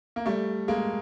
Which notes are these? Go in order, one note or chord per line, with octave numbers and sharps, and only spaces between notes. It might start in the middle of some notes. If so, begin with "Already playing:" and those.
A#3
G3 A3
G#3 A#3